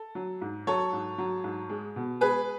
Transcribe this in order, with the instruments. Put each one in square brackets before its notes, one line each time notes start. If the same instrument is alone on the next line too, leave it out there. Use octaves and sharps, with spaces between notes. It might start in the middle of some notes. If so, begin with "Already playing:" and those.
Already playing: [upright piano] A4
F#3
G#2
F#3 A4 C#5
G#2
F#3
G#2
G#3
B2
G#3 G#4 B4